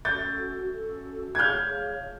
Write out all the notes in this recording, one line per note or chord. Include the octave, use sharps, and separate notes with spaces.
C#4 F#4 A4 G6 A6
C#4 F#4 A4
G#6
G#4 C#5 F5 F6 G6